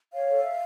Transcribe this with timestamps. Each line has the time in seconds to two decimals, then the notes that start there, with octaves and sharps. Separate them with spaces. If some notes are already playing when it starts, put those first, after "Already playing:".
0.13 C#5 F5
0.29 A4
0.44 E5